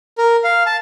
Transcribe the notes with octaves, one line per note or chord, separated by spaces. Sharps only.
A#4
F5
A5